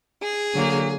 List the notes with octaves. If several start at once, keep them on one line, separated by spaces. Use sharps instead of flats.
G#4
D3 F#3 A#3